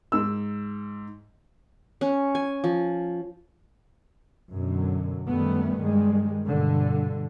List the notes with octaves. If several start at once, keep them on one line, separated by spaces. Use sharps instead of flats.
G#2 E6
C#4
G#5
F3
F#2 B2 D3 F#3
F#2 D#3 G3 A3 B3
G2 D#3 G3 G#3
G2 B2 D3